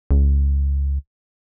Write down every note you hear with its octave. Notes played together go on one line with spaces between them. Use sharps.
C#2